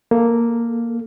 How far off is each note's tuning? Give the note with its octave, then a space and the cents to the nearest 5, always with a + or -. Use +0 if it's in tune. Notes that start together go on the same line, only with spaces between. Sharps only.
A#3 +0 A4 +15